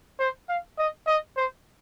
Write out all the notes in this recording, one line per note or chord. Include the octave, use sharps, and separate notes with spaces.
C5
F5
D#5
D#5
C5